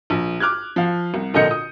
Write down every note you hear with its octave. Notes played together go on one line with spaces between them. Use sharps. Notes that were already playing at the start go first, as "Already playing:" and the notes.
A#1
D6 F6 F#6 G#6
F3 F5
C2
A#1 A#2 D3 D#5 G6 C#7
D#6